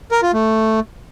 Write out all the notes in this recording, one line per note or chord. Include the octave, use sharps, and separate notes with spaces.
A#4
F4
A3